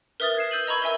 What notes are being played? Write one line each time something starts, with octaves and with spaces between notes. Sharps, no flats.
A#4 B4 E5 D#6 F6 A6
G#6 C7 E7
E6 G6 D#7 F#7
D#5 A#5 B5 C#6 G#6
A#4 E5 G#5 E6